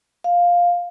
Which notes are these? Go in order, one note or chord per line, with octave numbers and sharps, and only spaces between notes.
F5